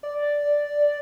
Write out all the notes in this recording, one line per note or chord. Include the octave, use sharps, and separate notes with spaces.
D5